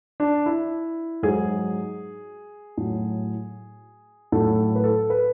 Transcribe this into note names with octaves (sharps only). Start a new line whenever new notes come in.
D4
E4
G#2 F#3 G#4
A2 F#3
A2 F#3 A4
B4
A4
B4